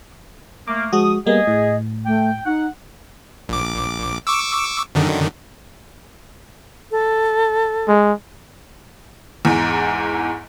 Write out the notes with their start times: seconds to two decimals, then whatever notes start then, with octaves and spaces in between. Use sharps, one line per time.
0.68 A3 A#3 D6
0.93 F3 G#3 F#4 D#6
1.27 G3 A#3 B3 G#4 D#5
1.47 A2
2.06 A3 G5
2.46 D#4 F#5
3.49 A#1 D6
4.27 C#6 D6 E6
4.95 F#2 D3 D#3
6.91 A4
7.88 G#3
9.45 E2 G#2